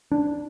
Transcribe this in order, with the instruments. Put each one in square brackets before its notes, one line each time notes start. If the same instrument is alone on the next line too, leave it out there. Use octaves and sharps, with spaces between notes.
[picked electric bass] D4